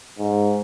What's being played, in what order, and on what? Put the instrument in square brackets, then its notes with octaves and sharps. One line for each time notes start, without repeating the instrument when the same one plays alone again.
[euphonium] G#2